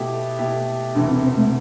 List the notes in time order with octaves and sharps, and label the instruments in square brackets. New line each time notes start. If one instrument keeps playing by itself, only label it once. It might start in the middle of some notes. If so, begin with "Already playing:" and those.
Already playing: [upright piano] B2 A3 E4 G4
B2 A3 E4 G4
[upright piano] E1 D2 C3 E3 [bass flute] D4
[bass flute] C4
C4
A3